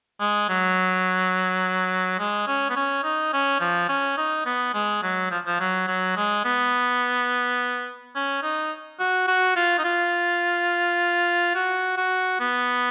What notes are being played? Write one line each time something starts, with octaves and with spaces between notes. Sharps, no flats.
G#3
F#3
G#3
C#4
B3
C#4
D#4
C#4
F3
C#4
D#4
B3
G#3
F#3
F3
F3
F#3
F#3
G#3
B3
C#4
D#4
F#4
F#4
F4
D#4
F4
F#4
F#4
B3